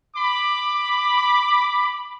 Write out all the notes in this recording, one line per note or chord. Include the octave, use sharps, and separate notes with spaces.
B5 D6